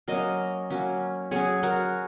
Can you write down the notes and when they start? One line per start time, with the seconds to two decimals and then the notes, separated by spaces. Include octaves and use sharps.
0.08 F#3 A#3 C#4 A#4 D#5
0.70 F#3 A#3 C#4
1.31 F#3 C#4 G#4 C#5
1.63 F#4 A#4